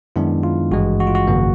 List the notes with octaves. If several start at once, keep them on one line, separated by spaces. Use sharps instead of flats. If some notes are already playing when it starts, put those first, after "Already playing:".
F#2 D#3 G#3 B3 D4 E4
F4
G#1 G2 E3 G#3 F#4
F#4
F4
F#4
G#1 F#2 C#3 F3 A#3